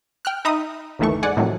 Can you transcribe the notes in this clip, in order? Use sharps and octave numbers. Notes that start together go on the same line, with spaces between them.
G5 F6 F#6
D#4 E5 A#5 B5 D#6
G1 D#2 D#3 E3 A3 C#6
G#2 D5 F#5 G#5
A2 C3 D#3 F3 F#3